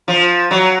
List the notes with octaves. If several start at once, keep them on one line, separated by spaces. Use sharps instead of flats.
F3
F#3